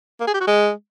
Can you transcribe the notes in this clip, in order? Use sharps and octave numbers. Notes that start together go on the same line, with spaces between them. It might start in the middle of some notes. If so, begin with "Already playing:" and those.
A#3
G#4
G4
F#4
G#3